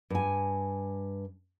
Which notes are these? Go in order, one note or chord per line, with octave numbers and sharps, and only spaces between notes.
G2 G#5